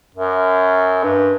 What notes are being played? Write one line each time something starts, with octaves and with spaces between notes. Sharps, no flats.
F#2
G2